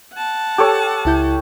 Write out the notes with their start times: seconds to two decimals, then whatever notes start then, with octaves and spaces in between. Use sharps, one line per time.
0.14 F#5 A5
0.58 G4 A4 C#5
1.05 C#2 E4 G6